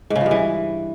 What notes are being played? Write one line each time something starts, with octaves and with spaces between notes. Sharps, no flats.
G#2
C#3
F3
G2
E3